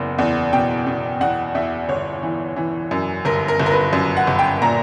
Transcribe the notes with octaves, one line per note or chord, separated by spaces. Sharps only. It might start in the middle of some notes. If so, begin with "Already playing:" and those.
Already playing: F#1 E2
E2
B2 G5
B2
E2 F#5
E2 E5
G1 C#5
E3
E3
F#2
G1 A#4
A#4
G1
A#4
B4
F#2
F#5
G1
G5
A#2 A#5